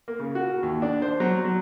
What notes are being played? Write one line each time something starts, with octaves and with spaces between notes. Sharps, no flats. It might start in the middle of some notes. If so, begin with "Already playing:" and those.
A#3
C#3
F#4
D#2
D4
C5
F#3
F#3